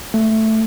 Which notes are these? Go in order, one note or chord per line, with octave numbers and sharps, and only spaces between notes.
A3